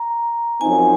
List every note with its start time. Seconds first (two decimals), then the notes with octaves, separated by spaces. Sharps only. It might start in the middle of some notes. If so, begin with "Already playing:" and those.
Already playing: A#5
0.60 F#2 F3 C4 D#4 G#5